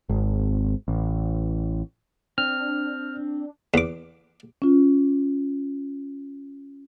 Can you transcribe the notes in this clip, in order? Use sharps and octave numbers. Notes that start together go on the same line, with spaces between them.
G#1
A1
C4 D4 F6
E2 D6
C#4 F4